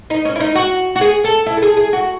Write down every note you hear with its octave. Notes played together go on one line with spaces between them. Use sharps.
D#4
C#4
E4
D#4
F#4
F#4
G#4
A4
E4
A4
G#4
G#4
F#4